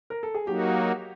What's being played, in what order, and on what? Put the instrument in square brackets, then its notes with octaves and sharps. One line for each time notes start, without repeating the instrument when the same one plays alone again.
[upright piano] A#4
A4
G#4
[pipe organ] F#3 A#3 D#4 F#4 [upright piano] G4